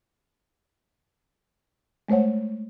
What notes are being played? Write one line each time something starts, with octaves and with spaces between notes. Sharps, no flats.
G#3 A3 C5 C#5 F#5